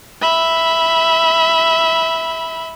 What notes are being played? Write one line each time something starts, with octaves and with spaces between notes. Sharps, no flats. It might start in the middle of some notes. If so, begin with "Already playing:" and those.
E5 B5